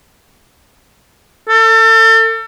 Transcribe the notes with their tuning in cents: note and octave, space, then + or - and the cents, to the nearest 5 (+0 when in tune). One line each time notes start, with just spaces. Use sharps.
A4 +35